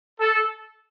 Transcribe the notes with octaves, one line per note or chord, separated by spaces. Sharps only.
A4